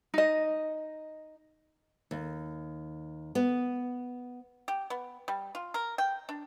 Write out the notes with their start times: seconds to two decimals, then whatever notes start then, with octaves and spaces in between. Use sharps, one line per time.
0.14 D#4 D#5
2.11 D#2
3.35 B3
4.68 G4
4.90 B3
5.28 G3
5.55 F4
5.74 A#4
5.98 G5
6.29 D4